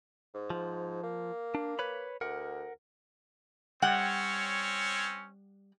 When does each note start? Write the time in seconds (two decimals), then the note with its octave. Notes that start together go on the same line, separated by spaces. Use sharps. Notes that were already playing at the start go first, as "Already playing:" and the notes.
0.34 G#2
0.50 F3
1.03 A#3
1.55 D4
1.79 B4 C#5 B5
2.21 D2 A#4 F#5
3.82 G3 C4 C#4 C#5 F#5 G5